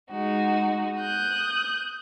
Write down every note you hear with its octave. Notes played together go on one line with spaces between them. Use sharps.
G#3 D#4 F#4
D#6 F#6 G6